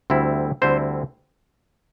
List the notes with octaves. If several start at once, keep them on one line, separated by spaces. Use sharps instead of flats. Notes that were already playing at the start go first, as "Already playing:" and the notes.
D2 D3 G3 C4 E4
D2 D3 G3 C4 E4 C5